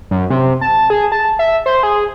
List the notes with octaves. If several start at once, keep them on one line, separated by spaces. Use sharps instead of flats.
F#2
C3
A5
G#4
A5
E5
C5
G#4